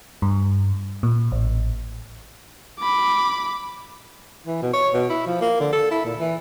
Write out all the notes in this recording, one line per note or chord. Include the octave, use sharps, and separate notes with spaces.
G2
A#2
A1
B5 D6
E3
B2
C#5
B2
E4
F3
A#3
D3
A4
E4
A#2
E3